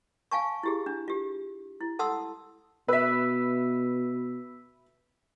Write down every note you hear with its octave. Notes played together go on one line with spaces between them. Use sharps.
F5 G#5 A5 C#6
E4 G4 G#4
D4
F4 G4
E4
A4 F#5 A5 C6 D#6 E6
B2 B4 E5 E6 B6